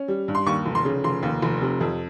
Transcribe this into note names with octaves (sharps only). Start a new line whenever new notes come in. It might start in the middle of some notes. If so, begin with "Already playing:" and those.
Already playing: C#4
G3
G2
C6
D#2 C#6
F1
C6
C#3
F1 C6
D#2
F1
C3
F2